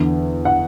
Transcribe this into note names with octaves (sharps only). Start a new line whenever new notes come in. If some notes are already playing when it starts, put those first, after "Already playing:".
Already playing: E2 D3
F#5